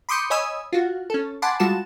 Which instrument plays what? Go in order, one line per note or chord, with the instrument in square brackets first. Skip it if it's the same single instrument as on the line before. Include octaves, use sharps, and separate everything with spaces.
[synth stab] B5 C6 D6 D#6 G6 C#7
C#5 D#5 G#5 B5 D#6 E6
F4 F#4
C#4 A4
F#5 G#5 A5 B5 C6 D6
G3 G#3 F4 F#4 A5 E7